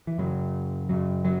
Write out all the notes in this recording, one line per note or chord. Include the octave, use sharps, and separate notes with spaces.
E3
F#2 C#3 F#3
F#2 C#3 F#3
F#3